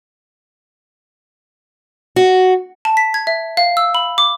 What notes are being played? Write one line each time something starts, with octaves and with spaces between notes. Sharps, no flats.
F#4
A5
B6
G#6
E5
F5
E6
B5
D6